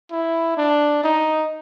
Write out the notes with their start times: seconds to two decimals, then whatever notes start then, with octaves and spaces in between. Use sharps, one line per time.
0.11 E4
0.57 D4
1.03 D#4